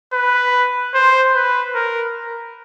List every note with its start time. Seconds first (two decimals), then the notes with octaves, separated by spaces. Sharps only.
0.14 B4
0.94 C5
1.35 B4
1.75 A#4